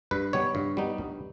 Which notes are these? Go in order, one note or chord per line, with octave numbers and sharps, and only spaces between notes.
G2 B4
G3 B3 D#4 C#5
G2
G3 B3 D#4
G2